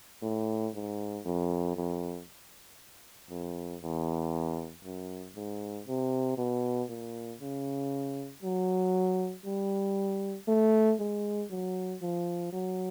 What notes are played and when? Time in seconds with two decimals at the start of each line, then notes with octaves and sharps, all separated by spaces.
0.22 A2
0.74 G#2
1.25 F2
1.76 F2
3.30 F2
3.82 E2
4.84 F#2
5.35 G#2
5.87 C3
6.38 B2
6.89 A#2
7.41 C#3
8.43 F#3
9.45 G3
10.48 A3
10.99 G#3
11.51 F#3
12.02 F3
12.53 F#3